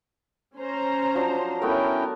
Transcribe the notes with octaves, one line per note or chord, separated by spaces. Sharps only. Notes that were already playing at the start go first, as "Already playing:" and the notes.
C#4 C5 A#5
F3 F#3 D4
A3 B3 C#4 E4 A#4 G5